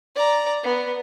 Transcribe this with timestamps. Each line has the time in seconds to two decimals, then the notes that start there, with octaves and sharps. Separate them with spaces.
0.15 D5 A#5
0.63 B3